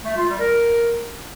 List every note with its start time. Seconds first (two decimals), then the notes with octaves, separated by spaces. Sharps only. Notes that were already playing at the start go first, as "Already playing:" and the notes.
0.05 A3
0.17 F4
0.28 G3
0.40 A#4